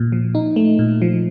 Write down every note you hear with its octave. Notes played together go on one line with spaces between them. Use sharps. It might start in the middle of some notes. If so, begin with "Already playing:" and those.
Already playing: A#2
F3
D#4
A3
A#2
F3